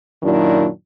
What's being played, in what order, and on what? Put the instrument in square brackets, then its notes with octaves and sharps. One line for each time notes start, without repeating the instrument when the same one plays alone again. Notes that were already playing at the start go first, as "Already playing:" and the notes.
[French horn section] F#2 A#2 D#3 F#3 D4 E4